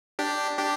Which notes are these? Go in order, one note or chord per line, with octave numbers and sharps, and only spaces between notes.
D4 G4
D4 G4